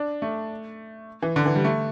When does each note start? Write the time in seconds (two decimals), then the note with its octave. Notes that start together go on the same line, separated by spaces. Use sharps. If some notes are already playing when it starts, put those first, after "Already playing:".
Already playing: D4
0.22 A3
1.22 E3
1.36 D3
1.46 E3
1.55 G3
1.65 A3